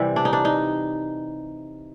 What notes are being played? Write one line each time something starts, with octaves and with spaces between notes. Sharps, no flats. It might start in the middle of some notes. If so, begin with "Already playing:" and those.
Already playing: C3 E3 G3
D4
D#4
D4
D#4